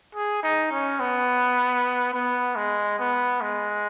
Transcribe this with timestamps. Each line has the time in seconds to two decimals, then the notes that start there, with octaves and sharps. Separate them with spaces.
0.15 G#4
0.43 D#4
0.72 C#4
1.00 B3
2.14 B3
2.56 G#3
2.99 B3
3.41 G#3